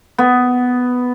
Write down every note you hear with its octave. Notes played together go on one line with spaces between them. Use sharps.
B3